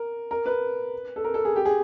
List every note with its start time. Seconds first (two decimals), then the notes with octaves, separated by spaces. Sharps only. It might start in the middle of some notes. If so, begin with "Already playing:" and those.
Already playing: A#4
0.31 A#4
0.46 B4
1.16 A4
1.25 A#4
1.34 A4
1.45 G#4
1.56 G4
1.65 G#4